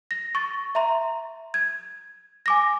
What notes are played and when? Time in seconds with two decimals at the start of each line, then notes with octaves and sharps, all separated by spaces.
0.11 A#6
0.35 C#6 A6
0.75 E5 A#5 C6
1.54 G#6
2.46 G#5 D6 A#6